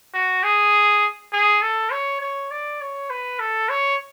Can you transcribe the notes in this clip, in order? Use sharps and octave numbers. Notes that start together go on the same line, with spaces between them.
F#4
G#4
G#4
A4
C#5
C#5
D5
C#5
B4
A4
C#5